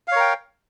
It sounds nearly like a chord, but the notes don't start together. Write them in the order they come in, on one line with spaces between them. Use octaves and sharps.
F5 C#5 A#4 G5